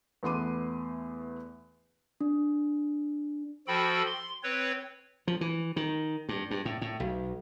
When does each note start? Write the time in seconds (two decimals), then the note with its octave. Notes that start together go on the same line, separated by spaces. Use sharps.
0.23 E2 A3 B3 C6 D6 D#7
2.21 D4
3.67 F3 F#4 A4 G5 B5
4.06 C6
4.43 C4 B4 C#5
5.27 F3
5.41 E3
5.76 D#3
6.29 G2
6.51 G2
6.65 A2
6.82 A2
7.00 B1